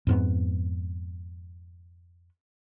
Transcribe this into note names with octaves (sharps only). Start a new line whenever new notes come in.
F2 G#2 B3